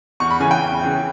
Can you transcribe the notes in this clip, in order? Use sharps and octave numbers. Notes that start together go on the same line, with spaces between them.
E2 C#6
B5
C#3 E3 G#5
G5
E2
C#3 E3